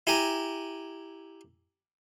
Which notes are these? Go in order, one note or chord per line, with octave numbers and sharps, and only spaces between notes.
E4 G4 G#5 A#5